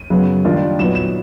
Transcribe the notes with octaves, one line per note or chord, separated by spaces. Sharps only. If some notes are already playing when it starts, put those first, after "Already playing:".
Already playing: D#7
F#2 C#3 F#3 B3
D#3 G3 A#3 D4 F4
A#2 F#3 B3 D#4 E7
E7